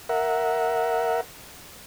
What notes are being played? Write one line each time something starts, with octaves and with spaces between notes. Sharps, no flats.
A#4 E5 F#5